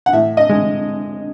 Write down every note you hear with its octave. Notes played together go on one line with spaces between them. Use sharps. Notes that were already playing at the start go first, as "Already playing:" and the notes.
F#5
A2 E5
D#5
G#3